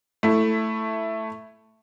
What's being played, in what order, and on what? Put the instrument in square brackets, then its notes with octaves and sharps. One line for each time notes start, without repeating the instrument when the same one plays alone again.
[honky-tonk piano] A3 E4